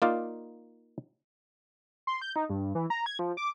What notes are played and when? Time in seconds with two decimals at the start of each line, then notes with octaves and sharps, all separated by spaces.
0.02 A#3 D#4 F4 D5 F5
2.07 C6
2.22 G6
2.36 D#4
2.50 G2
2.75 E3
2.90 A#5
3.06 G#6
3.19 F3
3.37 D6